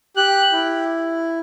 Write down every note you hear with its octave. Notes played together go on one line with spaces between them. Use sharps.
G4 F#6
E4